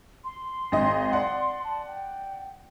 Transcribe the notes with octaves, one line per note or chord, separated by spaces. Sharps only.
C6
G#1 D#5
D5 F#5
A5
G5